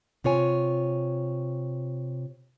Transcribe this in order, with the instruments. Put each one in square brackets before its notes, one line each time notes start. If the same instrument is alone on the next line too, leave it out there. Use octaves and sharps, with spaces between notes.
[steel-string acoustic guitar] C3 F4 C#5 G#5